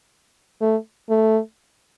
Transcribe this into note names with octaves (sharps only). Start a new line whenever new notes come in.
A3
A3